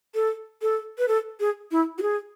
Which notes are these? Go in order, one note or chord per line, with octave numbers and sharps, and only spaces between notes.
A4
A4
B4
A4
G#4
E4
F#4
G#4